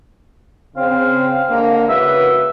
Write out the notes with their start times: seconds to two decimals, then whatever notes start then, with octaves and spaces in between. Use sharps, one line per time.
0.77 C#3 C4 F5
1.50 D3 G#3 A#3
1.89 C#3 F#4 B4 E5